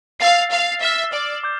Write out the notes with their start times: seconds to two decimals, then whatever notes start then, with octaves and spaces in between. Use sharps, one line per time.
0.20 F5 E6 A6 C7
0.51 F5
0.81 E5 F6 C7 E7 G7
1.12 D5
1.43 D6 G6